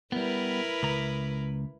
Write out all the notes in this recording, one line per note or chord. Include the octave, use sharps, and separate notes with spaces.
G3 B3 E4 A#4 B4
C#2 A#5